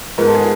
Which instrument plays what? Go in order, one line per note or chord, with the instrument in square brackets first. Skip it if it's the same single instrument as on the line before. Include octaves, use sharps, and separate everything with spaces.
[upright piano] G#2 F3 G#3 B3 A#4
A4
G#4